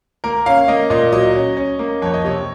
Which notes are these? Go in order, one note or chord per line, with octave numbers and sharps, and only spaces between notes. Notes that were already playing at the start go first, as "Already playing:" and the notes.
A#3 A#4
C#4 F5
A#3 D#5
A#2 D#5
F#3 D#5
C#4
C#4
A#3
F2 C#5
D#5
C3 C#5